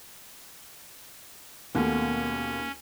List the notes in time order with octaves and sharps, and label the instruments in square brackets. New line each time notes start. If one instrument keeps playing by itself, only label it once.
[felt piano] D#2 A3 [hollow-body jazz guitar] B2 [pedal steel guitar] A#3 [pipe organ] C#4